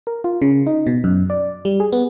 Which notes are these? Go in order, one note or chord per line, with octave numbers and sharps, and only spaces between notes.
A#4
F4
C#3
D#4
B2
F#2
D5
G3
G#4
B3